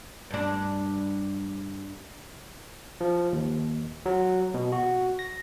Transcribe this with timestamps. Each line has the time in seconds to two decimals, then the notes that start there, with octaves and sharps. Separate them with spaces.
0.31 G2 D4
3.01 F3
3.32 D#2
4.06 F#3
4.54 B2
4.72 F#4
5.19 A#6